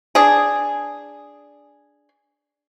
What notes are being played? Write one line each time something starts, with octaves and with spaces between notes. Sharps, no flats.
D4 G#4